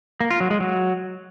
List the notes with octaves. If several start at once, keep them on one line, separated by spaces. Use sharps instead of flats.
A#3
F4
F#3
G#3
F#3